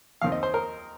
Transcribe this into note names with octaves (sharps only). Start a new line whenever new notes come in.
D#2 D#3 C4 F5
D#5
C5
A#4